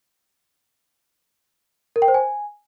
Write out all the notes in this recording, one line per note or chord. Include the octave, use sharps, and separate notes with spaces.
A#4
G5
C5
G#5